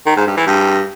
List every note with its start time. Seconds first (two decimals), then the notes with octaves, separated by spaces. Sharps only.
0.06 D#3
0.17 G#2
0.27 G2
0.37 E3
0.47 G2